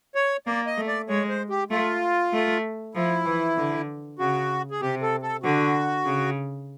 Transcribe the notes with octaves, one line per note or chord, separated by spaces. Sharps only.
C#5
A#3 D5
D#5
A3
D5
G#3 C#5
C5
G4
A3 F4
A3
F3 E4
E3
D3
C#3 F#4
G#4
C3 G4
A4
A4
D3 F#4
C#3